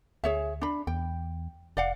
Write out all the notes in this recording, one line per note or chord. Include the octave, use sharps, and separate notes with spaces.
D2 G#4 C#5 E5
D4 B5
E2 G5
F1 D5 F5 F#5